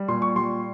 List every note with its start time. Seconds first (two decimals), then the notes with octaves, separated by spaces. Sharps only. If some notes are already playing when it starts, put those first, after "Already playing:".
Already playing: G3
0.08 A#2 C6
0.22 C#6
0.35 G3 C6